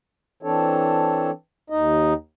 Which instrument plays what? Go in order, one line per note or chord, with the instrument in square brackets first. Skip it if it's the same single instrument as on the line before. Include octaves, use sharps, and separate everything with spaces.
[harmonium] E3 C4 D4 A4 C#5
D#2 D#4 D#5